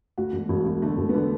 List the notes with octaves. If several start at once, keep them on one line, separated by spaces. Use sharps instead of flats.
D2 F#4
E1
E1
E1
D3 A3
E1
B3
D3 A3